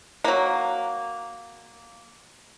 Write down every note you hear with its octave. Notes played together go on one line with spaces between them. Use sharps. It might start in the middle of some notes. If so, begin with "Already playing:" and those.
F#3 A#3